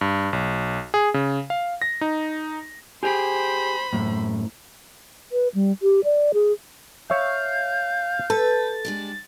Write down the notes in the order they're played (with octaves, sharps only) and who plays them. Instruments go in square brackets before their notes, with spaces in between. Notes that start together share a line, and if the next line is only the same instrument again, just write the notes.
[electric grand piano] G2
B1
G#4
C#3
F5
A#6
D#4
[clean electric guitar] G4 G#4 [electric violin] C5 B5
[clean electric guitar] F#2 A2
[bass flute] B4
G3
G4
D5
G#4
[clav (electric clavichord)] C#5 E5 [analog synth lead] F5 [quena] G6
[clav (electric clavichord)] A4 [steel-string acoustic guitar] B4 [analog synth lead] A6
[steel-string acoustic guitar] G#3 D4 G4